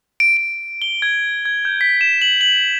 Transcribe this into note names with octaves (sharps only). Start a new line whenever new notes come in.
D7
D7
G7
G#6
G#6
G6
B6
E7
F#7
F#7